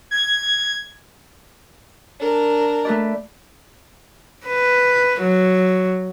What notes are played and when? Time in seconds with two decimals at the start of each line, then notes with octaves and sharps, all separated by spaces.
0.11 G#6
2.19 D4 A#4
2.85 A3 B4 D5
4.47 B4
5.21 F#3